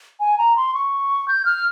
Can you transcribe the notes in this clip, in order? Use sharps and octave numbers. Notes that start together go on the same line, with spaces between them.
G#5
A#5
C6
C#6
G6
F6